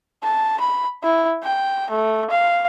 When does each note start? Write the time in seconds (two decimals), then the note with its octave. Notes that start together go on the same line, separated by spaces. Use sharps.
0.23 A5
0.60 B5
1.03 E4
1.43 G5
1.90 A3
2.30 F5